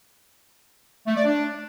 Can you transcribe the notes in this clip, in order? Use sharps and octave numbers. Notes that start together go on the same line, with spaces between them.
A3
D5
D4